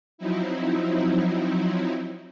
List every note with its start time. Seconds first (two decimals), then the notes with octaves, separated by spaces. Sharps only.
0.18 F3 F#3 C4 D#4 E4